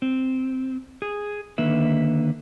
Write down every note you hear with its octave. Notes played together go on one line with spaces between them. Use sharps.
C4
G#4
D3 D#3 A#3 B4 E5